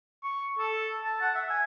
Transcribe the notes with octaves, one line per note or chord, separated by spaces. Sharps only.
C#6
A4
A5
F#5
E5
G#5